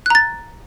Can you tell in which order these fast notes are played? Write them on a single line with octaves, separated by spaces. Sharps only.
F#6 A#5 A6